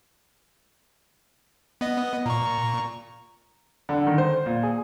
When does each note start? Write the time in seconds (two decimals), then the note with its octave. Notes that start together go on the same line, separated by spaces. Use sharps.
1.81 B3 D#5
2.26 A#2 A#5 C#6
3.89 D3
4.07 D#3
4.18 C5
4.46 A#2
4.63 G#4